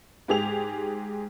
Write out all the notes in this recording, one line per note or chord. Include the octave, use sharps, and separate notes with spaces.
G#2 G4 G#4 F7